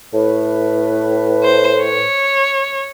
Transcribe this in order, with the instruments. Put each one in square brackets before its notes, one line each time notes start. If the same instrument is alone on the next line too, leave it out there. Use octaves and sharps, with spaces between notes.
[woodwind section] A2 B4
[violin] C5
C#5